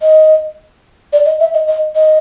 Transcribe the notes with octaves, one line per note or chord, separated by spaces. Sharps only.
D#5
D5
D#5
E5
D#5
D#5
D#5